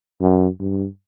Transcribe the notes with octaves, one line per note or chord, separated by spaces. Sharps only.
F#2
G2